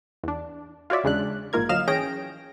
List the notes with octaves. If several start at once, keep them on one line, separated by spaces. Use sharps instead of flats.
E2 D4
F4 F#4 C#5 D5 E5
E2 C#3 G#3 D4 F#6
A#1 G#2 A#3 F4 A#4 G#6
D2 F#3 D#5 F5 F6 E7
E3 C#4 G#4 G5 A#6 D7